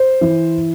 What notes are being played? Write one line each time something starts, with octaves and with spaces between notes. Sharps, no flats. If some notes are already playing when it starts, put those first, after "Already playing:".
Already playing: C5
E3